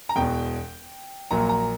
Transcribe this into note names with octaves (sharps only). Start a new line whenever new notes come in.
A#5
E1 E2 B2 G5
A#1 A#2 F#3 A#3 A#5
A#5